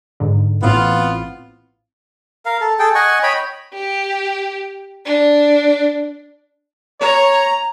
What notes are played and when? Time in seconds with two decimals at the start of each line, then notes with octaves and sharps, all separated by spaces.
0.20 G#2 D3
0.62 A1 A2 B3 C4 F4
2.46 A#4 F5
2.61 A4
2.79 G#4 A4 G5
2.95 D#5 F#5 G#5 C#6
3.23 C#5 D#5 G5 B5
3.74 G4
5.05 D4
7.01 C#5 A#5